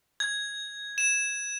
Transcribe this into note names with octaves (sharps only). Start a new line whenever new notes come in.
G#6
E7